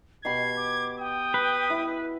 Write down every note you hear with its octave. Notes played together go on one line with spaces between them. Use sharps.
B2 G4 B5 G#6 C7
D6
G5 D#6
B4
E4